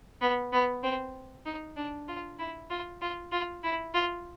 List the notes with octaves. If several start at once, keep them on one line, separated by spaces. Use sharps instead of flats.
B3
B3
C4
D#4
D4
F4
E4
F4
F4
F4
E4
F4